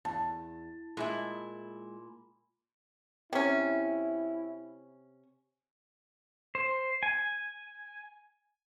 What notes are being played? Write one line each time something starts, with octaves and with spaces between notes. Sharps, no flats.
E2 A5
A#2 G#3 E4 E5
C3 C#4 E4
C5
G#5